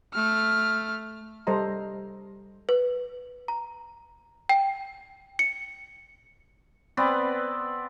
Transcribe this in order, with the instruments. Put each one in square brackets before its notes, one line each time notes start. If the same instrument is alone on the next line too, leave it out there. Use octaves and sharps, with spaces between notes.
[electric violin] A3 F6
[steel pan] G3 A4 C5 D#5 A#5
[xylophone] B4
A#5
G5
C#7
[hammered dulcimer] B3 C4 B4 D5